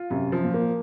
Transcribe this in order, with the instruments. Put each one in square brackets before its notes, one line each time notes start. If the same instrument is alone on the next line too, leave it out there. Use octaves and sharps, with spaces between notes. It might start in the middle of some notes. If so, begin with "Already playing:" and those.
Already playing: [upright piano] F4
[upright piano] F#2 [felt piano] C3
[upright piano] F3
[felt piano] A#2
[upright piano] A#3